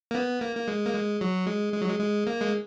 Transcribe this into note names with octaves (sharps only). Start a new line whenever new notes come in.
A#3
B3
A#3
A#3
G#3
A#3
G#3
F#3
G#3
G#3
F#3
G#3
G#3
A#3
G#3